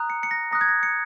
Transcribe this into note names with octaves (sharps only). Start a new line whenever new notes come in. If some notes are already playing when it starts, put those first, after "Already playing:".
Already playing: A#5 D#6 F#6
C#7
C#7
A#6
A#5 D#6 F#6 A#6
G#6
A#6
C#7